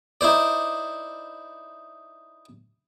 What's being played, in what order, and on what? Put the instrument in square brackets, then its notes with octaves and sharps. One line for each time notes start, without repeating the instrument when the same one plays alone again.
[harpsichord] D#4 E4 C5 D5